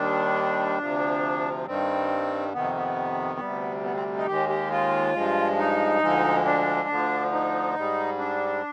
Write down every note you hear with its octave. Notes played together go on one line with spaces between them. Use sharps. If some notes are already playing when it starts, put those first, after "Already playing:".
Already playing: D#2 D#3 G3 D4
D2 C3 F3
G2 D#3 G3 C4
F2 C3 D#3 B3
B3
D2 C3 G3
B3
C4
D#4
D#2 D#3 G#3 G4
G4
F4
G2 F3 G#3
D#4
D2 D3 F3 G#3
D4
D2 D3 F3
D#4
G#2 G3
D4